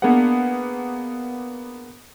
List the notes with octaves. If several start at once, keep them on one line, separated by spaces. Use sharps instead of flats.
A#3 B3 D4 G#4 B4 F#5